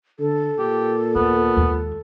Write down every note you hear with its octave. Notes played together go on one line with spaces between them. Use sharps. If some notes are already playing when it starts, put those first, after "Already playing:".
D3 A4
A#2 G4
D#2 B3
D#2 G#3